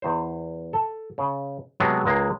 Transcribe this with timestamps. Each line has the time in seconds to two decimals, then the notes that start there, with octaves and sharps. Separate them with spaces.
0.02 E2 C5
0.73 A4
1.18 C#3
1.80 C3 F#3 G#3 A3 B3
2.05 C#2 G#3 A#3